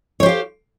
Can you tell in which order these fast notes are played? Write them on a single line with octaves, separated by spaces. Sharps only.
C#5 C5 G4 F5